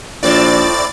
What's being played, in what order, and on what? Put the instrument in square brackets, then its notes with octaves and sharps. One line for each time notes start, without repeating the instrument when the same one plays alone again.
[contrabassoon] A#1 [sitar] A2 C4 [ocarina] F4 [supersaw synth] D5 A6